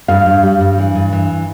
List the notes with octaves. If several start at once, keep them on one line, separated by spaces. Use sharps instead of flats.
G2 F5
G2
G3
G2
E3
G2
E3